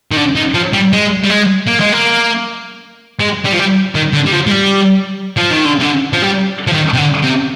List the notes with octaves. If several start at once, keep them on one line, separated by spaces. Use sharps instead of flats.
D#3
D3
D#3
F3
G3
G#3
G3
G#3
A#3
G#3
A#3
G#3
G3
F3
G3
D#3
D3
G3
F3
G#3
G3
F3
D#3
D3
C3
D3
F3
G3
F3
D#3
C3
D3
C3